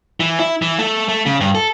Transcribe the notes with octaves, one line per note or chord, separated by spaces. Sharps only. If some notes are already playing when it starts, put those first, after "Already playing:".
E3
E4
E3
A3
A3
C#3
G2
A4